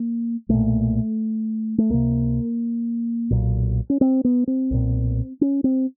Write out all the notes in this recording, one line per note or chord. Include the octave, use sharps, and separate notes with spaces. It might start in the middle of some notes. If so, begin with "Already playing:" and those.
Already playing: A#3
B1 A#2 A3
A3
C#2 C3 A#3
B1 A#2
C#4
C4
B3
C4
B1 A#2
C#4
C4